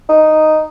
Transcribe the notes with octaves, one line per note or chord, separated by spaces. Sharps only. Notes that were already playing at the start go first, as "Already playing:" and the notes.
D#4